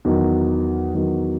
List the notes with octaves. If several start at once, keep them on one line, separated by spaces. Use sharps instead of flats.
E2 D#3 F#3
E2 D#3 F#3